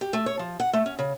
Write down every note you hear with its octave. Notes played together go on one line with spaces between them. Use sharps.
G4
A3
C#5
F3
F#5
A3
C#4
C#3